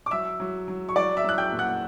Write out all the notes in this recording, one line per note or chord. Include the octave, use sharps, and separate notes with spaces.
D6
F#3 E5 E6
F#3
F#3
C#6
F#3 D5 D6
E5 E6
F#3 F#6
G5 G6
A#2
F#5 F#6